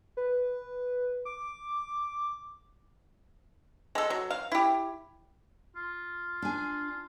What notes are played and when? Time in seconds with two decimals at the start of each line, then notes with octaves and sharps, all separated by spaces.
0.17 B4
1.25 D6
3.95 G#3 A4
4.10 F#3
4.31 F5
4.52 E4 G4
5.76 F4
6.42 D4 G#5